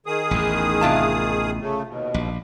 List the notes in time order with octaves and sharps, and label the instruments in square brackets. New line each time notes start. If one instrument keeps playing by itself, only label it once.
[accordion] D#3 G#4 D#6
[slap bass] A1 E2
[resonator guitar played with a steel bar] C3 F4 A5
[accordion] C#3 A3
D#2 B2
[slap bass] A#1